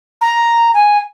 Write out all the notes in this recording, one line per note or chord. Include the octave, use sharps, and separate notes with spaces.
A#5
G#5